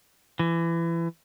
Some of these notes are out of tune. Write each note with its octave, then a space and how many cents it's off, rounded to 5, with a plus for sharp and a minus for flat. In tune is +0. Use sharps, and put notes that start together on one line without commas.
E3 +25